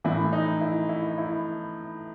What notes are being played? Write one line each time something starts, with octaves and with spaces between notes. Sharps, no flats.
A2 E3 E4
D#4
E4
E4
E4